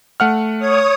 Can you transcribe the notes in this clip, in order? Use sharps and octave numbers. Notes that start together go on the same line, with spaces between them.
A3 F#5 F6
C#5 D#6